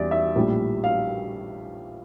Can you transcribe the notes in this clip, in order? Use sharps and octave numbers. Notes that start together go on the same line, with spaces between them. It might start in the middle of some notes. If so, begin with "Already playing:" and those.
Already playing: E2 E3 G3 D5 E5
E5
A#1 A2 G3
F5